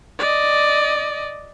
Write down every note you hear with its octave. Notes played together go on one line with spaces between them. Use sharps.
D5 D#5